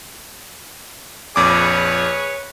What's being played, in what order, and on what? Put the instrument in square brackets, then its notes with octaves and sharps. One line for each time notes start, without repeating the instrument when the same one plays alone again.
[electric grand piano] A#1 F2 D6 [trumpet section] G#4 B4 C#5